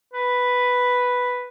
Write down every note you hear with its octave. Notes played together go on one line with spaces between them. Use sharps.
B4